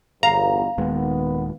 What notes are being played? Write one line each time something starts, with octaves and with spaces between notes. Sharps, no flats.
G1 E2 F5 A#5
D#1 D#2 D#3 G#3 B3